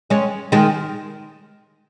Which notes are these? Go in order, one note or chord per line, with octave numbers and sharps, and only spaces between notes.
G#3 C#4
D#3 G#3